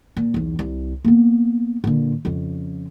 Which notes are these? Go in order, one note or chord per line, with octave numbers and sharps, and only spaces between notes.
A#2
B1 E2
C2
A#3 B3
A#2 D3
F2 C#3